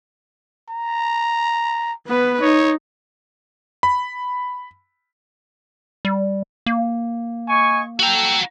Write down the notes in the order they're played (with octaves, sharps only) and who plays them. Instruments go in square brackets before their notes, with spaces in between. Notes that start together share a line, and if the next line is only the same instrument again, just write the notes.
[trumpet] A#5
[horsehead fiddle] B3 B4
[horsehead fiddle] D#4 [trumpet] C#5
[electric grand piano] B5
[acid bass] G3
A#3
[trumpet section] D#5 G#5 C#6
[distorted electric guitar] F#4 A#5 [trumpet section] A4 G5